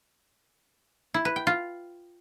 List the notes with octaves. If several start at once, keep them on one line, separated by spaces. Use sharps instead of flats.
E4
B4
G5
F4